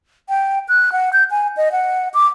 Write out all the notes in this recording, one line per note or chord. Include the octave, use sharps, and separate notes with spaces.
G5
F#6
F#5
G6
G#5
D#5
F#5
D6